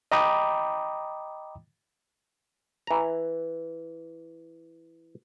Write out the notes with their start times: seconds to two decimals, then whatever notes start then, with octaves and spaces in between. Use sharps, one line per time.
0.12 D#5 G5 A#5 B5 D6 D#6
2.87 E3 A#5